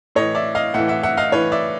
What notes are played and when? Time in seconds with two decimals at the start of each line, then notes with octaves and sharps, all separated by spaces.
0.15 A2 E3 C#5 D#5
0.35 D5 E5
0.55 D#5 F5
0.74 A2 E3 E5 F#5
0.88 E5 F#5
1.03 E5 F#5
1.17 D#5 F5
1.32 A2 E3 B4 C#5
1.52 D5 E5